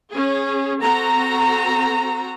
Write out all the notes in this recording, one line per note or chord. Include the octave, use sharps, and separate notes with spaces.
C#4 G#4
C4 F#4 A4 A#5